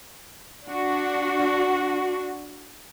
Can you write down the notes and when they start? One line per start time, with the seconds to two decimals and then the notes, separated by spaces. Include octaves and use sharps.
0.66 D4 F#4